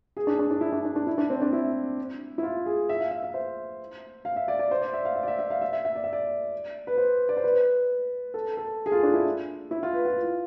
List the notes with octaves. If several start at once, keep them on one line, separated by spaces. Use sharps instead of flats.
G#4
D4
D4
D4
E4
D4
D4
D4
E4
D4
C4
D4
E4
E4
F4
G#4
E5
F5
E5
E5
C5
F5
E5
D5
D5
C5
D5
E5
F5
E5
D5
E5
E5
F5
E5
E5
E5
D5
E5
D5
B4
C5
D5
C5
B4
A4
A4
G#4
F4
D4
E4
E4
F4
B4
F4